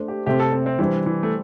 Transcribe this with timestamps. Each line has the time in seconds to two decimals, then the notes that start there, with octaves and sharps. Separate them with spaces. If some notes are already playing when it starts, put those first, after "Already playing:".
Already playing: A3 D4 C5
0.08 G4
0.26 C3 A3 C4 G4
0.40 A4
0.52 C4
0.66 C4
0.79 E3 G3 D4 C5
1.06 E3
1.23 A3